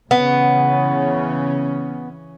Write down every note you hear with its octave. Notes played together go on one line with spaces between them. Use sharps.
C#3 E3 B3 C#4